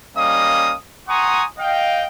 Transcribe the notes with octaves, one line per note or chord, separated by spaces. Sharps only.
G3 A#3 C#4 D#5 F5 D#6
F#5 G#5 A#5 C6 C#6 D#6
D#5 F5 G5